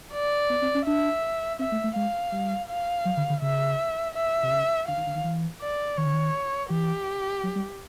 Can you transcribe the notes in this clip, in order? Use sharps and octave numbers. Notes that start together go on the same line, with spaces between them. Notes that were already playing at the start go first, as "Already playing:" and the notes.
D5
B3
C4
C#4
D4 E5
C4 E5
A3
A3
G#3 F5
G3
F5
F#3
D3
D3
C#3 E5
E5
C3
C#3
D3 F5
D#3
D3
D#3
E3
D5
D#3 C#5
D3
D#3
E3 G4
F#3
G3